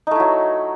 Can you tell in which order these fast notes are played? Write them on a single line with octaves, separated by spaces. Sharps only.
D#4 A3 E4 F#3